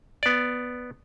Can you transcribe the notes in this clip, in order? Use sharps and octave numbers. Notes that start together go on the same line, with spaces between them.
B3 D5